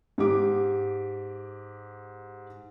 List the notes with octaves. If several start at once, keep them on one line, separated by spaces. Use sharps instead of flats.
G#2 G4 D6